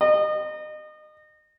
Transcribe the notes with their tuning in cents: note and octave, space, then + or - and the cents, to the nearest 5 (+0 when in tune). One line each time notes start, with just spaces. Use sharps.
D#5 -30